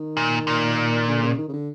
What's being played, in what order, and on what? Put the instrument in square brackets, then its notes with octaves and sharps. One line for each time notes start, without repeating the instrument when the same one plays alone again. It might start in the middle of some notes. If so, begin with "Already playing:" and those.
Already playing: [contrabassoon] D#3
[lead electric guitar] A#2
A#2
[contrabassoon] D3
C#3
D#3
C#3
D3